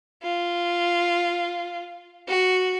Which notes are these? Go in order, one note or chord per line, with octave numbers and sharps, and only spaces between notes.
F4
F#4